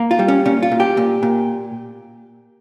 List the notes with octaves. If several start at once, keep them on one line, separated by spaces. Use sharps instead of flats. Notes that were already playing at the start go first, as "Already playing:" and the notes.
Already playing: A#3
F4
G3
C#4
A#2 C#4
F4
A#2
G4
A#2
A#2